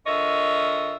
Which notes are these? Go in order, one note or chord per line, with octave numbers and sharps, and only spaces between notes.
D3 F4 A#4 C#5 D#5 E5